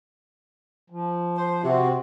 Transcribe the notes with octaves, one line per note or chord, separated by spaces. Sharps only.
F3
C5
C3 C4 F#4